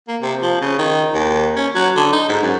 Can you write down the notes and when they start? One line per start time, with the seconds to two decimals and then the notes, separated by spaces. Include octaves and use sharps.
0.08 A#3
0.22 C3
0.42 F3
0.61 C#3
0.79 D#3
1.14 D#2
1.56 C#4
1.75 F#3
1.96 D3
2.12 D#4
2.29 G#2
2.43 F#2